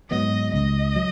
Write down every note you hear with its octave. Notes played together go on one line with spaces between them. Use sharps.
G#2 F#3 B3 D#5
C#2 D#5
F#3